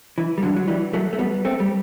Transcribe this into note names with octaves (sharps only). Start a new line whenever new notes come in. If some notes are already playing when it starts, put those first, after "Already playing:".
E3
G3
D3 F#3
F#3
E3 G3
F#3 A3
A3
G3 B3
A3 C4
G3